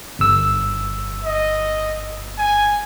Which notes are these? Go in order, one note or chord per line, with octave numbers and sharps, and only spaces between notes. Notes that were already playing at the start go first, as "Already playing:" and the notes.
G1 E6
D#5
G#5